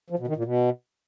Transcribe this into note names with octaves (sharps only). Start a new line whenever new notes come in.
F3
B2
D#3
A#2
B2